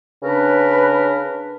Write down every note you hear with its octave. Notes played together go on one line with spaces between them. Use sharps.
C#3 D4 A#4 B4